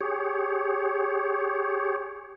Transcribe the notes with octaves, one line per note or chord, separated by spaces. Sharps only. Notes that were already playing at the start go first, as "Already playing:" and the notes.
G4 G#4 C#5